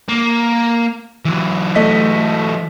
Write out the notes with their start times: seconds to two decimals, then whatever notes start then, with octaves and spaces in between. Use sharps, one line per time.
0.08 A#3
1.25 E3 F#3
1.75 A3 D#5 B6